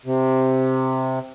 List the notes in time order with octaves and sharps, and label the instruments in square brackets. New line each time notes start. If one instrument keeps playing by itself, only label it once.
[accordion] C3